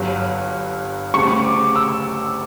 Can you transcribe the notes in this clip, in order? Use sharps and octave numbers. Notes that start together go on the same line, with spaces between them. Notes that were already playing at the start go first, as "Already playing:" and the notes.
Already playing: G1 G2 F#3
D2 C#3 G3 C#6
D6
E6